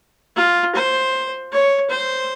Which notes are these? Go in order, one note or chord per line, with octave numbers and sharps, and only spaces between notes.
F4
C5
C#5
C5